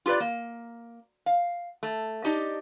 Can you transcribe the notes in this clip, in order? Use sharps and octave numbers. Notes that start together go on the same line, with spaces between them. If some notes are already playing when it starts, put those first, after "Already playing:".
F4 G4 A#4 B4 D5
A#3
F5
A3
D4 D#4 G4 D#5